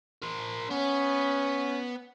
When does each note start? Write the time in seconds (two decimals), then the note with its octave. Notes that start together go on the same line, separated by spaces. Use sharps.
0.22 A#4 C5
0.70 B3 C#4